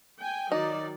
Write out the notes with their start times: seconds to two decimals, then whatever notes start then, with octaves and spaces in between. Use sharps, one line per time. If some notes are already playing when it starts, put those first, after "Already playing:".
0.21 G5 G#5
0.52 D#3 F#3 D#4 D5